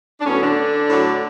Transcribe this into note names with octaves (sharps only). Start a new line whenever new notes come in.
D4
A2 F#3 B3 C#4
D3 D4
A2 F#3 A3